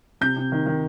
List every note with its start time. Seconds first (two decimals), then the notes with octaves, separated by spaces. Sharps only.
0.21 C3 G6
0.37 C3
0.52 D#3
0.66 D#3